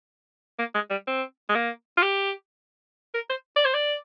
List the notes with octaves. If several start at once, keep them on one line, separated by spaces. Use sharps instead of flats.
A#3
G#3
G3
C4
G#3
A#3
F4
G4
A#4
C5
D5
C5
D5